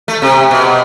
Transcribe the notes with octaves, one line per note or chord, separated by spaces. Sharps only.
A3
C3
B2